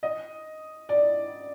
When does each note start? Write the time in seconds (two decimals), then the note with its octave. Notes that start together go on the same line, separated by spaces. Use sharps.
0.03 D#5
0.89 D5